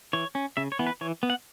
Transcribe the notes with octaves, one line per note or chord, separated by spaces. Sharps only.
E3 C#5
C#4
C#3 E5
C#5
E3 B3
B4
E3 C#5
B3
F#5